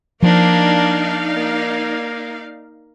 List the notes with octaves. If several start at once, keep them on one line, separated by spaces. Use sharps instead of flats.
F3 A#3 D4 D#4 D5 F5
A#3